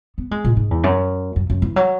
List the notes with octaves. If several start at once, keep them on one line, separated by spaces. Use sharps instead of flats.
B3
G#3
A#2
G#2
E2
F#2
F#2
F#2
E3
F#3